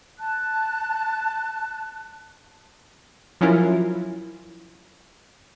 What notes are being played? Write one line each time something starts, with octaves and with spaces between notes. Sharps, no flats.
A5 F#6
F3 F#3 C#4 E4 F4 A#4